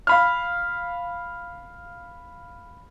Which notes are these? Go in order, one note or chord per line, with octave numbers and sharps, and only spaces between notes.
F5 B5 F6